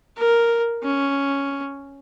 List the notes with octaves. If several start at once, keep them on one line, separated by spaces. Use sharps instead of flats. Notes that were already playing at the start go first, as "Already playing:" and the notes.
A#4
C#4